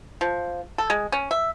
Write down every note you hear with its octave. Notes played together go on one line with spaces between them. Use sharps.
F3
A4
G#3
C#4
E5